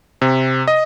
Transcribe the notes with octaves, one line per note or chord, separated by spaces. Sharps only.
C3
D#5